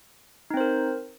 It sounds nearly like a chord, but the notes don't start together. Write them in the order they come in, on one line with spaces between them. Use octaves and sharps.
D#4 C4 C5 A#4